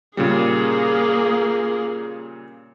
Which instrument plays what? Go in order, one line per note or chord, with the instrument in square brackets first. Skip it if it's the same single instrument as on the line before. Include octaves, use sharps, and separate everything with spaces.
[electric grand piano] A#2 C#3 G3 [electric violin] A#3 G#4